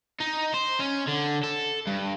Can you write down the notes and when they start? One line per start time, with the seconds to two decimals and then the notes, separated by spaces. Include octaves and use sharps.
0.20 D#4
0.54 C5
0.80 C#4
1.08 D3
1.43 A4
1.87 G2